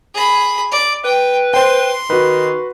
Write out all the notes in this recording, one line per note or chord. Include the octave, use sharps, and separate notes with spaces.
G#4 B5
D5
B4 G5
C5 G5 C6
D#3 F#4 B4